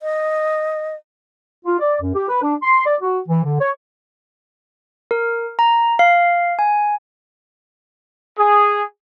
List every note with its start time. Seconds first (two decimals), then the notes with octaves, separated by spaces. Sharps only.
0.01 D#5
1.66 F4
1.79 D5
2.01 F#2
2.15 G4
2.29 B4
2.42 D4
2.63 C6
2.85 D5
3.01 F#4
3.28 E3
3.44 D3
3.59 C#5
5.11 A#4
5.59 A#5
5.99 F5
6.59 G#5
8.37 G#4